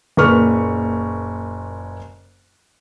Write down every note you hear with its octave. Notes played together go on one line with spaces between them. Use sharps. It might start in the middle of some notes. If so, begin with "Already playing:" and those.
F#1 A#2 B4 C#6 F6